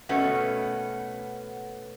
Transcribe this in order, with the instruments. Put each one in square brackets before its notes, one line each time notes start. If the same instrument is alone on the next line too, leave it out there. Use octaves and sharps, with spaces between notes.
[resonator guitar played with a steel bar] B2 A3 B3 C#4 F#4